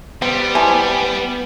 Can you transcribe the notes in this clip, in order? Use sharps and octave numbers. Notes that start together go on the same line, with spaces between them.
G3 B3 C4
E3 C4 G#5 A5